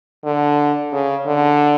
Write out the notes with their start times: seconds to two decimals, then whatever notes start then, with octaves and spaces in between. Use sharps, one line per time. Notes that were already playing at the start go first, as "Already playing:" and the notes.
0.24 D3
0.92 C#3
1.26 D3